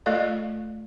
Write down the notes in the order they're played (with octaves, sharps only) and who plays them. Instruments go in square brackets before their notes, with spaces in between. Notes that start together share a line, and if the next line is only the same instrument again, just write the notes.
[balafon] A3 F4 A4 D5 D#5 F5